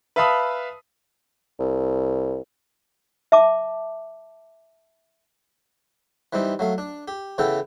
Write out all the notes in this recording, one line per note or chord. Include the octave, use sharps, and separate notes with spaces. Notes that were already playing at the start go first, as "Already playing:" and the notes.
B4 E5 F5 A5 B5 D#6
C2
E5 A5 D6
E3 G3 C4 D#4
F#3 A3 F5
D4
G4
C#3 E3 B3 A4 G5